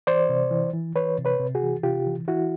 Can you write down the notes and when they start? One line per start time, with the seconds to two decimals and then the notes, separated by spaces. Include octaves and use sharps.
0.07 E3 C5 D5
0.29 C3
0.51 E3
0.73 E3
0.96 E3 B4 C#5
1.18 C3
1.25 B4 C#5
1.39 C3
1.55 F#4 G#4
1.62 E3
1.83 C3 F4 G4
2.06 E3
2.28 E3 E4 F#4